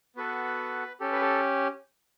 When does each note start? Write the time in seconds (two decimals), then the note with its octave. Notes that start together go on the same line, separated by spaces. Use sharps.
0.16 B3 F#4 A4 B4
1.00 C#4 G4 A4
1.12 B4
1.21 A4